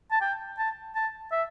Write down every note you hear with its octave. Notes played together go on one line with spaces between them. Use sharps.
A5
G5
A5
A5
E5